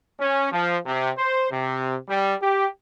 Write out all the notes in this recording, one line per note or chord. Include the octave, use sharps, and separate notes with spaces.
C#4
F3
C3
C5
C3
G3
G4